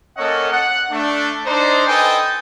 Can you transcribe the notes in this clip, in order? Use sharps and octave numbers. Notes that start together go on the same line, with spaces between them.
A#3 C#4 A4 C#5 D#5 F#5
F#5
A3 D4
D4 D#4 C5
A4 B4 D#5 G5 G#5